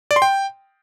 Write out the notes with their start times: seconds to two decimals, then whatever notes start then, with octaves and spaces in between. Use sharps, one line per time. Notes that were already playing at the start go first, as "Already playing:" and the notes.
0.11 D5
0.16 C6
0.22 G5